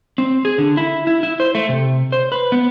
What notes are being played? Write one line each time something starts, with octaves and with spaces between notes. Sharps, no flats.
C4
G#4
D3
E4
E4
E4
C5
A3
C3
C5
B4
B3